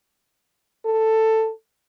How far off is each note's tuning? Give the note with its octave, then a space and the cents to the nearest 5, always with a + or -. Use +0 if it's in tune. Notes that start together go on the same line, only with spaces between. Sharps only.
A4 +10